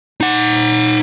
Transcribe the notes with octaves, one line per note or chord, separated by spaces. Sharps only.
D#4 F#5